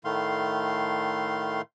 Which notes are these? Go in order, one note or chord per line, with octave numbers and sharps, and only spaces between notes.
A2 D#3 A3 F5 C6